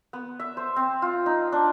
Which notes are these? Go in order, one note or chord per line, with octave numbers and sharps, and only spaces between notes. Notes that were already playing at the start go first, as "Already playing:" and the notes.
B3
E5
C5
C4
F4
D#4
D4